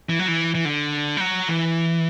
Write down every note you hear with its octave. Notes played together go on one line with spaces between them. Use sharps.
E3
F#3
E3
E3
D3
G3
F#3
E3